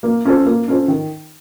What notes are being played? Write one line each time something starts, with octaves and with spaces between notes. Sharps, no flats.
A#3
C#4 F4 A4 C5
A#3
C#4 F4 A4 C5
D#3